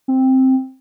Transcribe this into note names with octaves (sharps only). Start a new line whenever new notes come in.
C4